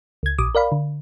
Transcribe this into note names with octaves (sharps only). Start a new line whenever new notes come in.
C#2 G#6
A#1 D6 D#6
A#4 D5 F5 B5
D3